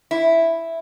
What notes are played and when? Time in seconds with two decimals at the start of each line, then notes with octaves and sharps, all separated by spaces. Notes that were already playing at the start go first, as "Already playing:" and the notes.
0.11 E4